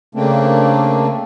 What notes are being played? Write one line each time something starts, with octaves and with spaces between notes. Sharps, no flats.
C#3 A3 A#3 C4 D4